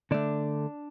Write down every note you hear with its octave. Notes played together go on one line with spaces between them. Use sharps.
D3 A3 D4